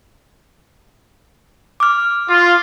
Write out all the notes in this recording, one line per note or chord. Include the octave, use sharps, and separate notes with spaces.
D6 F6
F4